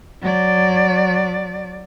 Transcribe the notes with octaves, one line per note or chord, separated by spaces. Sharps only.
F#3 D5